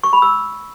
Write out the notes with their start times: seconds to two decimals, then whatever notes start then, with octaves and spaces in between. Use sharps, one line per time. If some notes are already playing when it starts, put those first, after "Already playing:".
0.03 C#6
0.13 B5
0.22 E6